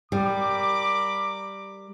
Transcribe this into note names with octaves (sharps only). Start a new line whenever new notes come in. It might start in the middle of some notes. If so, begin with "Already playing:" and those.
G3 A#4 B5 D6